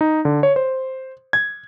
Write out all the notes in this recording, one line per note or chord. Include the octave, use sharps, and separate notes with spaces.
D#4
D3
C#5
C5
G#6